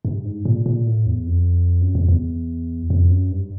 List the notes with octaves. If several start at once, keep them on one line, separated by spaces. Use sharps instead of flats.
G2
G#2
A#2
A#2
A2
E2
F2
F#2
F2
E2
F2
F#2
G2